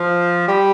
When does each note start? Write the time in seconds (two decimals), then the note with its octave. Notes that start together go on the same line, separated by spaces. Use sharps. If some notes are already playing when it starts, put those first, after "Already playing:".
Already playing: F3
0.47 G3